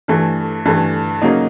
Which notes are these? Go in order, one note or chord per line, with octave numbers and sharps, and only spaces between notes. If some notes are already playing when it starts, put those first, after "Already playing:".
G2 E3 A3
G2 E3 A3
C#3 F#3 A#3 D#4